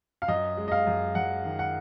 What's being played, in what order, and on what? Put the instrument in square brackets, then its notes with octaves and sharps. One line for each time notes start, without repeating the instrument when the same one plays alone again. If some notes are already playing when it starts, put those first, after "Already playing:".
[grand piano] F5
F#2 D#5
G#3
D#5
F5
F#2
F#2 F#5
D#3
F#5